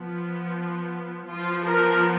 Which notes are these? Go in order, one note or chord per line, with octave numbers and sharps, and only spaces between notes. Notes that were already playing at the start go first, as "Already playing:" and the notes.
Already playing: F3 B3
F3 B3 F4
A#4